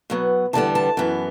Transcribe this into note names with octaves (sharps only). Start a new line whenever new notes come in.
B2 F#3 B3
E2 D3 G3 B3 A5
A5
F#2 E3 B3